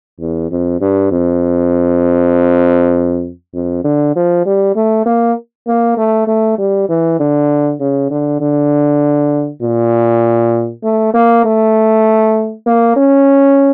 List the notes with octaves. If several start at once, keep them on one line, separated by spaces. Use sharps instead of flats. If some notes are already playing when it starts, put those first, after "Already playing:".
E2
F2
G2
F2
F2
D3
F3
G3
A3
A#3
A#3
A3
A3
G3
E3
D3
C#3
D3
D3
A#2
A3
A#3
A3
A#3
C#4